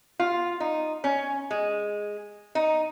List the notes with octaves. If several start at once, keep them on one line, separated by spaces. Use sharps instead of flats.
F4
D#4
C#4
G#3
D#4